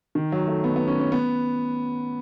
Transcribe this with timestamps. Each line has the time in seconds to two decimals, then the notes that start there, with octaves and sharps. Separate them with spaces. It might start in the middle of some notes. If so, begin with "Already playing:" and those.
0.15 D#3
0.32 F#3
0.47 A3
0.64 B3
0.76 B3
0.88 C#4
0.99 C#4
1.12 B3